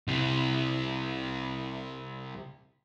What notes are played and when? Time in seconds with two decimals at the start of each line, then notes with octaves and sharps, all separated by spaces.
0.08 C2 C3